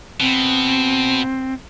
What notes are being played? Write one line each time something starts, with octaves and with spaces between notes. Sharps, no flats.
B2 C4